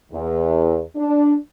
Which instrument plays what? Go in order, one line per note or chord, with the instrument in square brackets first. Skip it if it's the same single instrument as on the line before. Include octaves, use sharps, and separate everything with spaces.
[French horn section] E2
D4